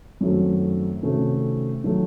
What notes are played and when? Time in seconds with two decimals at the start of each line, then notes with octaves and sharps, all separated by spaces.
0.21 F#2 D#3 A3 C4 F#4
1.03 C3 D#3 A3 C#4 F#4
1.84 D#3 F#3 A3